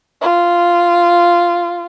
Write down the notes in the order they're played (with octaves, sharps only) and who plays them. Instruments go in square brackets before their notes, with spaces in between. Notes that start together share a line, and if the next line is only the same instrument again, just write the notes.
[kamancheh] F4